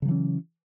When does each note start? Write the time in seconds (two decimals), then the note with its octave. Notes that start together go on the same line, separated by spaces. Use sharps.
0.02 C#3
0.05 F#3
0.08 E3
0.11 C#4